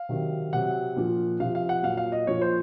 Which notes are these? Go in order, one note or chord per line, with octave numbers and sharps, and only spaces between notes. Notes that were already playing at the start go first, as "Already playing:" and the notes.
Already playing: F5
C3 D#3 F#3
C3 F#3 F#5
A#2 F3
C3 F3 F5
F5
F#5
A#2 F#3 F5
F5
D#5
A#2 F3 C#5
C5